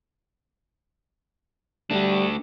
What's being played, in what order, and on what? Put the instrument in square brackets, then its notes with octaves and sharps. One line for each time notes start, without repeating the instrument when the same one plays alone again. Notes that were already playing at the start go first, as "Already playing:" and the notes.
[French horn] G3 [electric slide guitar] A3 D4